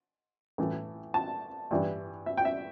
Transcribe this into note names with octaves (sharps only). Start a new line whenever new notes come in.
A2 E3 A3
A5
G2 E3 G3
E5
G5
E5